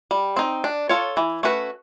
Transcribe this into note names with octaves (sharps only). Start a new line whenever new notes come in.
G3
C4 D#4
D4
F4 A4 C#5
E3
A3 C#4 F#4 B4